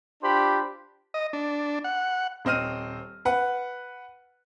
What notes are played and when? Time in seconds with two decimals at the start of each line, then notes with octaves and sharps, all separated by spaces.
0.23 D4 F4 G4 C5 B5 C6
1.14 D#5
1.33 D4
1.84 F#5
2.45 D#1 C4 D#5 F6 D#7
3.25 B4 F#5